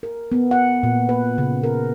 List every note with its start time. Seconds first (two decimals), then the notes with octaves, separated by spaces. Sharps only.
0.03 A#4
0.32 B3
0.51 F#5
0.83 A#2
1.09 B4
1.38 C#3
1.63 A#4